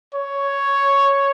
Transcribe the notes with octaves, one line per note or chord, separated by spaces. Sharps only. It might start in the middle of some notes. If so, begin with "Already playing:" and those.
C#5